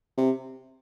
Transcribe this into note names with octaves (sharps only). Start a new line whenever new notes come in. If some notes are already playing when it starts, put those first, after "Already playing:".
C3